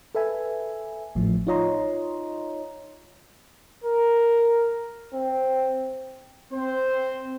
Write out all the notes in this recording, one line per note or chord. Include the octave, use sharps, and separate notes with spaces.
A4 B4 E5 G#5
G#1 A2 F3
D#4 F4 C#5 D#5 A#5 C6
A#4
C4
C4 C5